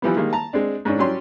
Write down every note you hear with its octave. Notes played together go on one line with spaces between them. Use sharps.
E3 F3 G3 B3
D#3 G3 G#3 A#3
A5 A#5
G#3 C4 D4
G#2 C#4 D4
F#3 G3 C#4 G4 D5 C6